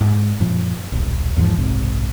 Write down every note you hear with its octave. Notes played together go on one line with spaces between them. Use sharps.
G#2
F#2 A#2 F3
D#1 B1
E2 G#2 E3 F3
F#1 B1 G#2 C3